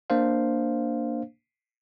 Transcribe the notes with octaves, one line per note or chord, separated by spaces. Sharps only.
A#3 D4 C5 F5